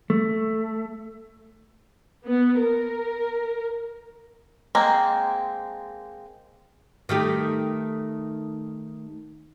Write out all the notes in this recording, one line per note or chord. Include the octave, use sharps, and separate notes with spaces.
A3
B3
A#4
G#3 A#3 C4
D#3 A3 G4